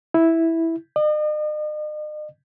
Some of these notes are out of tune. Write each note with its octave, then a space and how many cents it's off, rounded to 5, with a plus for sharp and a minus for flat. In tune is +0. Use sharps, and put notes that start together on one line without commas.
E4 -5
D#5 -45